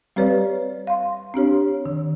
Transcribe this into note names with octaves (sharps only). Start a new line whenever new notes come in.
G3 C4 G4 B4 C#5 D5
F5 C6
C4 D4 G4 C#5
D#3